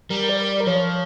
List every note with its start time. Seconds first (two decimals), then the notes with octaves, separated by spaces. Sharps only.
0.10 G3 A#4
0.29 D5
0.48 D5
0.61 A#4
0.67 F3 C#5